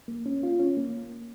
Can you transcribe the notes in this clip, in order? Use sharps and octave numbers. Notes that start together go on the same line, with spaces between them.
A#3
C#4
F4
C#4
A#3